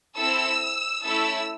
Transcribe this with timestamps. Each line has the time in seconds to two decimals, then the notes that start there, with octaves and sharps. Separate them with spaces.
0.16 C4 E4 A4 E6
1.03 A3 C#4 E4 A4 E6